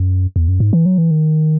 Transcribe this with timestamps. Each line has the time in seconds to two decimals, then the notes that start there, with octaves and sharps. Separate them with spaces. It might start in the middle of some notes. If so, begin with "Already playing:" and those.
Already playing: F#2
0.36 E2
0.48 F#2
0.60 G#2
0.73 E3
0.86 F#3
0.98 E3
1.11 D#3